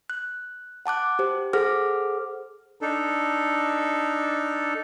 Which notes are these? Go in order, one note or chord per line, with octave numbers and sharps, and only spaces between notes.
F#6
F#5 A5 D6 F#6
G4 C5
G#4 A4 C5 F#5 D6 F6
D4 D#4 A4